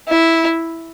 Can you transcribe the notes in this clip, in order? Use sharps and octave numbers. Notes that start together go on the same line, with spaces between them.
E4